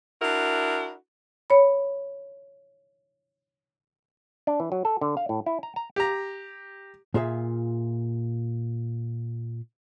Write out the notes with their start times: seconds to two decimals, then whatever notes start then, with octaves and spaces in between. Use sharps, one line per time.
0.22 D4 E4 F#4 A#4
1.50 C#5 B5
4.47 D4
4.60 E3
4.72 F#3
4.85 A4
5.01 D3
5.17 F5
5.29 A2
5.46 E4
5.63 A#5
5.76 A#5
5.96 G4 A#5
7.14 A#2 F4 G#4 E5 F5